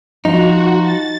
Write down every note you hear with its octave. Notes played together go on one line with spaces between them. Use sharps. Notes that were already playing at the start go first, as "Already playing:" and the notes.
F3 D#4 F#4
A6